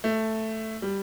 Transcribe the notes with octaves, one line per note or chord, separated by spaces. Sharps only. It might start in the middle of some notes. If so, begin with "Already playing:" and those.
A3
G3